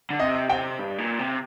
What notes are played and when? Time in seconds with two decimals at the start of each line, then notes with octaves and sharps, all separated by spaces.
0.10 D3
0.19 C3 D#5
0.49 C3 G5
0.79 G2
0.98 A#2
1.19 C3